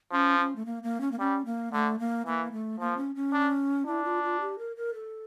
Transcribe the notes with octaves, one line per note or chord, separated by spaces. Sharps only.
F3 C#4
C#4
A3
A#3
A#3
C#4
A#3
G3 C#4
A#3
D3 A3
A#3
E3 A#3
A3
F3 A#3
C#4
C#4
D4
D4 E4
F4
F4
G4
A#4
A#4
A4